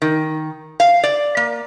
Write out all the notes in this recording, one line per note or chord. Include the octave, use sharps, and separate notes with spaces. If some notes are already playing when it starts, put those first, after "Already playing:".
D#3
F5
D5
A#3